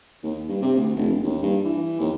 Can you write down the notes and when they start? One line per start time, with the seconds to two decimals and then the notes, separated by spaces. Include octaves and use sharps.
0.23 D#2
0.49 G2
0.62 C3
0.76 D2
0.96 F1
1.10 E1
1.24 D#2
1.43 G2
1.65 E3
2.00 D#2